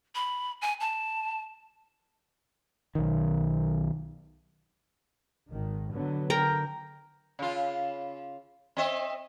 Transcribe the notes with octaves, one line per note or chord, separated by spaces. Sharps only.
B5
G#5
A5
B1 D#3
G#1 D#3
D3 F#3 B3
D3 A#4 G5 A#5
C#3 F4
C4 D#5 E5